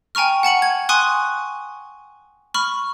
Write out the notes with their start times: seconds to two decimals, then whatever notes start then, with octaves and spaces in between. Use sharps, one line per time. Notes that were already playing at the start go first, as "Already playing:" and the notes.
0.15 G5 G#5 A#5 C#6 F6
0.43 F#5 A5 C#7 F#7
0.62 G#6
0.89 G#5 C6 C#6 D#6 F#6
2.54 B5 C#6 F6